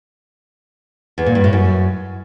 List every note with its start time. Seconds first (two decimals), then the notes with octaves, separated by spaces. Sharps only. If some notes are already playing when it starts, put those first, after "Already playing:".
1.18 E2
1.26 A#2
1.35 G2
1.44 A2
1.53 F#2